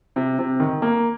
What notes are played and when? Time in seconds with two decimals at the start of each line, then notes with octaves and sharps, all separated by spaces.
0.16 C3
0.39 C3
0.60 D#3
0.82 A#3